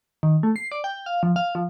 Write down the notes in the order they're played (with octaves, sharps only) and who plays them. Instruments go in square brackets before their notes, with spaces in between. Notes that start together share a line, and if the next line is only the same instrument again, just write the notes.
[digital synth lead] D#3
A3
C7
D5
G5
F5
F3
F5
F3